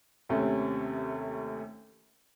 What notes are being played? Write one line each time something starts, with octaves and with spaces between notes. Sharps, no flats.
D#2 C3 A3 C#4